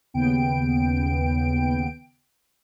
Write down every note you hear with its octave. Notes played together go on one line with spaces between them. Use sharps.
D#2 C#3 B3 G5 D7